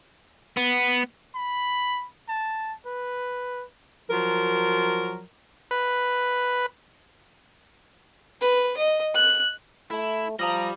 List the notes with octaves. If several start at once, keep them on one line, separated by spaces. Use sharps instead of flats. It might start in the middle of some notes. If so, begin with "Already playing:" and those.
B3
B5
A5
B4
F3 F#3 A#4
B4
B4
D#5
F#6
A3 E4
F3 G3 A#5 D#6 A#6